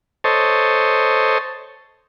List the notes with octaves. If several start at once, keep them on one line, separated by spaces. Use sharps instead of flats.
A4 C5 C#5 D#5